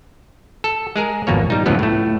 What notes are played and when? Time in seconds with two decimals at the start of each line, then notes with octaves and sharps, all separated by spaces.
0.64 A4
0.96 G#3 G#4 A#4
1.27 G#1 F2 B2 A#3 C#5
1.50 G3 D#4
1.66 C#2 F#2 A2 F3 F#3 B3
1.79 A2 A3